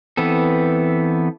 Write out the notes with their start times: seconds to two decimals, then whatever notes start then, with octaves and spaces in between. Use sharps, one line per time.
0.17 E3 B3 C4 A4